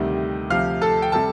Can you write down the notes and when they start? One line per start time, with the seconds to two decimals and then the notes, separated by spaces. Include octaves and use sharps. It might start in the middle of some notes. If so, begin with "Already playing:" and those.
Already playing: D2 C3 D#3 G3
0.50 D2 C3 F3 F5 F6
0.81 A4 A5
1.02 G5
1.12 C3 G3 A4 A5